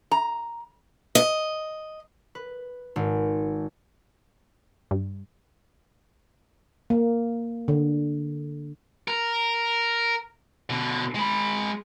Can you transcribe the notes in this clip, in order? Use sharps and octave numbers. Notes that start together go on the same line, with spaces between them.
A#5
D#5
B4
G#1
G2
A#3
D3
A#4
B2 D3
G#3 B5